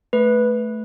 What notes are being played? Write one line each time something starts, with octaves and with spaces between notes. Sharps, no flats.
A3 B4